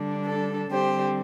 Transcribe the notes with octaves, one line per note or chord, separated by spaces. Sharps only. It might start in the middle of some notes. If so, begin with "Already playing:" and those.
Already playing: D3 G3 D4
A4
D3 G3 C4 G4 C5